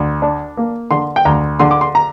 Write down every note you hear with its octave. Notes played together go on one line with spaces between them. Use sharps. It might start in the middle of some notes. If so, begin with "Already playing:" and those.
Already playing: D2
D4
A#3
D3 C6
G5
D2 A#5
D3 C6
D6
C6
A#5